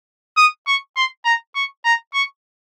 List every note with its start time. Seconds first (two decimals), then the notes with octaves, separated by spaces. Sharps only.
0.37 D#6
0.67 C#6
0.96 C6
1.25 A#5
1.55 C#6
1.85 A#5
2.14 C#6